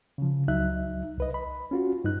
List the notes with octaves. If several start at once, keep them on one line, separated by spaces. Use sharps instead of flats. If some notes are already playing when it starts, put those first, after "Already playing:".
C#3 F3
C#2 F#3 D#4 E5 F#6
C2 B4 D#5
B5
C#4 F4 F#4
G2 D#4 F#6